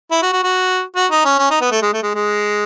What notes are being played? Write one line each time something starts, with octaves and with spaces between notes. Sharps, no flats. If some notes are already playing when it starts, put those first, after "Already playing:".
E4
F#4
F#4
F#4
F#4
D#4
C#4
C#4
D#4
B3
A3
G#3
A3
G#3
G#3